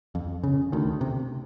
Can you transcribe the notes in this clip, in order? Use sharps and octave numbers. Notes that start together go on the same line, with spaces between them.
F2
C#3
D2 D#3
C3